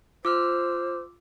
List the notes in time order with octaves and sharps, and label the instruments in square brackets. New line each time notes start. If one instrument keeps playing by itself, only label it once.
[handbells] F4 E6 F6 [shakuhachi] C5 [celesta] D6